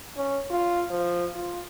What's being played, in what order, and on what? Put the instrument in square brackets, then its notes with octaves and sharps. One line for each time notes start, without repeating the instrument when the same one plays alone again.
[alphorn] C#4
F4
F3
F4